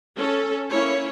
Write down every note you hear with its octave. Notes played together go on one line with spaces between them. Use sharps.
C#4 A4
A#3 C#4 E4 C#5